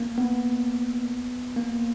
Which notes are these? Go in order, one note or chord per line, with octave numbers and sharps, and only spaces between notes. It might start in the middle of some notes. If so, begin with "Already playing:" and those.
Already playing: A#3
B3
A#3